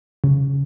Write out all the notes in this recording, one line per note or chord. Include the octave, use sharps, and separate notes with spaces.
C#3